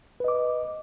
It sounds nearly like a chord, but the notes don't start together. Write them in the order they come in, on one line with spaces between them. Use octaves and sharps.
B4 D#5 D6